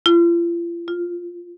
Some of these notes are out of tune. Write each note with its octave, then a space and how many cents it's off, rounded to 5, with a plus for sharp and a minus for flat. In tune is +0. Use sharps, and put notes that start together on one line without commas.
F4 -40
F4 +0